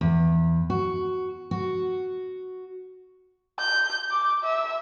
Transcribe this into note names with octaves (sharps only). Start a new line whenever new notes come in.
E2
F#4
F#4
G6
D6
E5